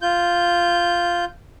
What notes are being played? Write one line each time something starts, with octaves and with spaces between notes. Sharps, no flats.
F4 G6